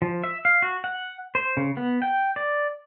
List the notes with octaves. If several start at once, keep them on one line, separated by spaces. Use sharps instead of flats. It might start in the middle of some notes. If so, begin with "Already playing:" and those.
F3
E5
F5
F#4
F#5
C5
C#3
B3
G5
D5